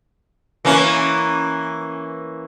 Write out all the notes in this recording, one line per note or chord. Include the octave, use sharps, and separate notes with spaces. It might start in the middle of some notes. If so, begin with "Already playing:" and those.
E3 A#3 C#4